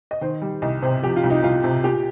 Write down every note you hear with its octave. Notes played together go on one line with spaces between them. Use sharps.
D#5
D#3 C5
G3
C2 D#5
C3 C5
F3 G4
F4
C2
D#4
C2 F4
C3
A#2 G4